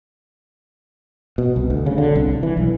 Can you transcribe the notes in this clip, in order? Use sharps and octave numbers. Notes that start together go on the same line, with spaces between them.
B2
C2
D2
C#3
D3
C2
E3
B1